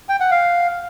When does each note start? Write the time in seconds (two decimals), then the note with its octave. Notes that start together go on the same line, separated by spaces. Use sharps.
0.09 G5
0.20 F#5
0.31 F5